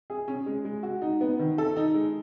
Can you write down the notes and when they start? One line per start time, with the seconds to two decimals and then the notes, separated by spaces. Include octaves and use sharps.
0.10 G#4
0.28 C#4
0.46 G#3
0.65 G#3
0.83 F#4
1.02 D#4
1.21 B3
1.39 D#3
1.58 A4
1.77 D#4
1.94 G#3